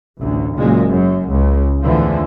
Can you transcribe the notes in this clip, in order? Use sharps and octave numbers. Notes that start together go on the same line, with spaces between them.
A1 D2
F#1 A#2 G#3
F#2
C#2 C#3
E2 A2 D3 E3 F3